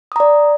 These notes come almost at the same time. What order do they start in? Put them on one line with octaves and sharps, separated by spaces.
D#6 A#5 D5